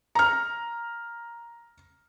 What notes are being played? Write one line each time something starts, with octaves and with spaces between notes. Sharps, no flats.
A#5 F6